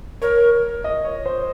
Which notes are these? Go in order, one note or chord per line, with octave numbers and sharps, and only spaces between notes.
A#4 C#5
D#5
C#5
C5